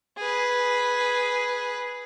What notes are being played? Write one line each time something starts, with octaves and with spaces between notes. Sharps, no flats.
G#4 B4